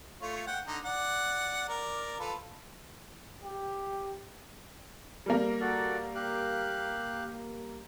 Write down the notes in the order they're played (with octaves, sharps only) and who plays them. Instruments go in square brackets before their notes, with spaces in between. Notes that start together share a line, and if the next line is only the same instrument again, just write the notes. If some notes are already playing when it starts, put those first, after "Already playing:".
[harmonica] A3 F4 C#5
F#5 G5
D3 D#4
D5 F#5
A#4 D5
F4 A4 B4
[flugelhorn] G4
[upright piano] G3 A#3 [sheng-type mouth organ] A#4
[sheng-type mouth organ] F#4 A4 D5
G4 F5 F#6